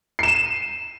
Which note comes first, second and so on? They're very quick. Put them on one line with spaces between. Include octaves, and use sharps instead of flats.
C7 E7 D#7